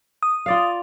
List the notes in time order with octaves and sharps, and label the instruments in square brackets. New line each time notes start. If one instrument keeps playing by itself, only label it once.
[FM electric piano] D#6
[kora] F4 D5 F5